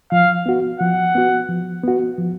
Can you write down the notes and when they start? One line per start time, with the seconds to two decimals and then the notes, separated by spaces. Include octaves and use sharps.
0.11 F3 F5
0.46 B3 F#4
0.80 F3 F#5
1.15 B3 F#4
1.49 F3
1.84 B3 F#4
2.18 F3